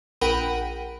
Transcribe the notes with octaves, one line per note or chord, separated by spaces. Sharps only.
A#1 A#4 F#5 G5 B5 D#7